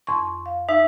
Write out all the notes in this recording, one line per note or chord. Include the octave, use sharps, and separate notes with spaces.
F2 C6 C#6
F5
D#4 E5